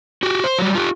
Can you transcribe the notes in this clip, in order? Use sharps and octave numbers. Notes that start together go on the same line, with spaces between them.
F#4 G4
C5
F#3 G3
F4 G4